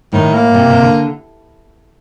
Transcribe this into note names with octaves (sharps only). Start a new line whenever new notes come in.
A2 D#3
A#3
C3
C3
D3